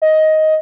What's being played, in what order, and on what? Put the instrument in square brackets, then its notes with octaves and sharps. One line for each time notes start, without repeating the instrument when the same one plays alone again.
[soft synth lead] D#5